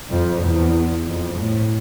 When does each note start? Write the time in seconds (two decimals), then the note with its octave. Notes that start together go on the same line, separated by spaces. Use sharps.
0.10 F2
0.42 E2
1.06 F2
1.38 A2